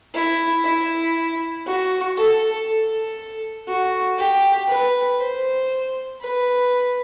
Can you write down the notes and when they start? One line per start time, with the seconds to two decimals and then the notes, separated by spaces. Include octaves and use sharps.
0.14 E4
0.65 E4
1.67 F#4
2.17 A4
2.67 A4
3.68 F#4
4.18 G4
4.68 B4
5.19 C5
6.21 B4